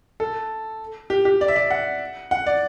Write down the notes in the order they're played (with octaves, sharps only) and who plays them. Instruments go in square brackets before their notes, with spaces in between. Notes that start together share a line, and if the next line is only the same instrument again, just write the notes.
[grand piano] A4
G4
G4
D5
E5
D5
F#5
F#5
D5